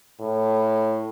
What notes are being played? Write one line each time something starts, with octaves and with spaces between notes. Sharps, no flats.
A2